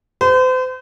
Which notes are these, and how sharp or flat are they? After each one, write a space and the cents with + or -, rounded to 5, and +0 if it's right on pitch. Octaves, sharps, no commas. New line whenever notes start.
C5 -40